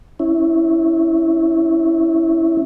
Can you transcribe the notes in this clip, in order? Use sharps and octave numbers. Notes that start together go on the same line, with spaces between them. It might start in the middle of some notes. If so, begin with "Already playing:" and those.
C#4 E4